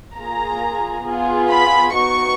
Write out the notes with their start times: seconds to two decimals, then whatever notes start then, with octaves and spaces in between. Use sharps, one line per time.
0.15 A#3 F4 G#4 A#5
1.04 B3 F4 G#4
1.49 B5
1.93 B3 D#4 F#4 C#6